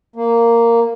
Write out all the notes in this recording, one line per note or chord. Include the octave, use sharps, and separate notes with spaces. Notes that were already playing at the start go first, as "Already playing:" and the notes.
A#3